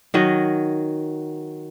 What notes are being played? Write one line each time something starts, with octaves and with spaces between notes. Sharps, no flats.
D#3 F#3 D#5